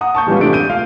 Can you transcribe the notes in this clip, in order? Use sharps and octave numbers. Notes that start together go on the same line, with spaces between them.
F#5 A#5 D#6
A5 C#6 G6
E3 G3 G#3 B3 C#4 F4
C3 A3 D4 D7
G6 D7 D#7
F4 F5